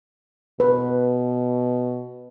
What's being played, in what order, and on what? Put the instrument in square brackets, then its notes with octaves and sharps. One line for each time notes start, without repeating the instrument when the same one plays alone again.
[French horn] B2 [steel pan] B4